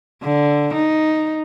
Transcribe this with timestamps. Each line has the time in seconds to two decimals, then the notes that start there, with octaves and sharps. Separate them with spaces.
0.23 D3
0.74 D#4